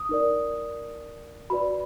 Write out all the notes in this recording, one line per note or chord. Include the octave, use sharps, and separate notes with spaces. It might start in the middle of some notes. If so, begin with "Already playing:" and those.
Already playing: D#6
D#4 A#4 D5
F#4 B4 D5 B5